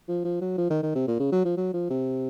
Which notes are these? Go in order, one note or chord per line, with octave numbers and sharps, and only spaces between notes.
F3
F3
F#3
F3
D#3
D#3
C3
A#2
C#3
F#3
F3
F#3
F3
C3